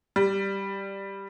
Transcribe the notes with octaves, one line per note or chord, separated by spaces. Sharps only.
G3